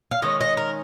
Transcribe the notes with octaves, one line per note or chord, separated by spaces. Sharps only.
F5
D#3 G#3 C#4 D#5
D#5
A#4